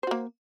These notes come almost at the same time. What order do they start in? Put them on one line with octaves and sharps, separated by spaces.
C5 F#4 A#3